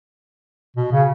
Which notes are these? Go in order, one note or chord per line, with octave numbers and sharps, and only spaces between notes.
B2
C#3